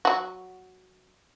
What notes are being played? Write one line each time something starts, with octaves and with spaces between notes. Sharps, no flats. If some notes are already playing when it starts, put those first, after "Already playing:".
F#3 F#4